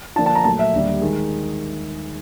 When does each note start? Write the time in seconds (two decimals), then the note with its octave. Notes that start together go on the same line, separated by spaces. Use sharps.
0.16 D3 F3 A#3 D4 F4 A5
0.26 A5
0.35 A#5
0.44 A#2 F#3 A3 A5
0.59 E5
0.73 D#2 D3 G3
1.01 D#3 G#3